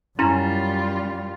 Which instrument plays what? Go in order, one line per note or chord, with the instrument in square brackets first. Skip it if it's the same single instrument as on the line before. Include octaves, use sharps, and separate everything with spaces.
[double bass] F#2 [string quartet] G3 F4 [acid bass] C#4 [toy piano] E4 A#5 C6